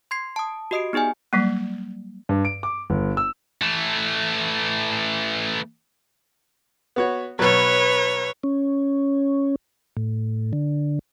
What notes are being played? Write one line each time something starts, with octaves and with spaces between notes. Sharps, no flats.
C6 G#6 C7
A5 D#6
F#4 G4 D#5 D#6 C7 D7
B3 D#4 G#4 D5 G#5
F#3 G3 A#3
G2
D7
D6
G1
E6
E3 A3
B3 F#4 C#5
B2 F#3 B4 C#5
C#4
A2
D3